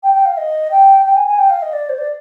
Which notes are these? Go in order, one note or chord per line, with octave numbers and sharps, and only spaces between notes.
G5
G5
F5
D#5
G5
G5
G#5
G#5
G5
F5
D#5
D5
C5
D5